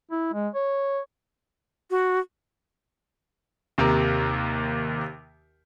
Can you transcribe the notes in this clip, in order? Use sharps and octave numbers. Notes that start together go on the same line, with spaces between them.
E4
G#3
C#5
F#4
D#2 C3 A#4